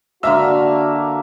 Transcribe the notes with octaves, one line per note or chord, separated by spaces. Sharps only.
D3 A#3 F#4 E5 F5 E6